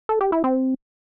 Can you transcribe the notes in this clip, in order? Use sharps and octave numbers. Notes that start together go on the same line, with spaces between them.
A4
G4
E4
C4